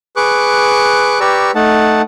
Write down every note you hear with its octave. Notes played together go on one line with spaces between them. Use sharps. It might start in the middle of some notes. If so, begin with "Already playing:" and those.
G#4 B4 C#6 D6 F#6
G4 B4 D5 A#5 C#6 E6
A3 D#4 F#5 A5